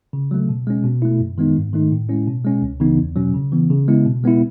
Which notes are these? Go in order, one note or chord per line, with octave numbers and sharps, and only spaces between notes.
C#3
F#3 A3
B2
G#3 C#4
B2
A3 E4
F#2
D#3 G#3 B3 D#4
G#2
D#3 A3 D#4
A2
G#3 C#4 E4
B2
G#3 C#4
C#2
C#3 E3 B3 D#4
E2
B2 F#3 C#4
C#3
E3 B3
C#3
G#3 B3 E4
B2
G#3 B3 E4